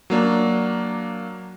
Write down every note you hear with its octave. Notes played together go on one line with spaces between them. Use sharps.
F#3 A#3 D4